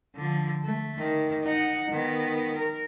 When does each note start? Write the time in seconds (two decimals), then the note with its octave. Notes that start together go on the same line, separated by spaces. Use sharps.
0.16 D3 F3
0.64 A3
0.99 D#3
1.43 D#4 F#5
1.91 D#3 B3
2.56 A#4